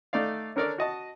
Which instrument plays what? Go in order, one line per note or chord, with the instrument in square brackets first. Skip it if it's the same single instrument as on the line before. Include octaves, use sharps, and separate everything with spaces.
[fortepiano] A3 D#4 D5 F5
C#4 D4 A4 A#4 C#5 D5
F#4 D#5 A5